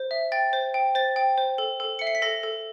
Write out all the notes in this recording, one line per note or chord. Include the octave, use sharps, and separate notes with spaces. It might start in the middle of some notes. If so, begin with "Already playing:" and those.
Already playing: C5
E5
G5 A6
C5
G5
C5 A6
G5
C5
A4
A4
E5 C#7
C7
B6
A4 A#6
A4